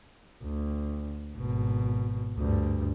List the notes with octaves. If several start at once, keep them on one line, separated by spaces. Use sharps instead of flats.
D2
G#1 B2
D2 G2